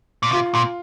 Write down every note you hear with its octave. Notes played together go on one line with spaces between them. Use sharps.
A#2
C3 F4
A#2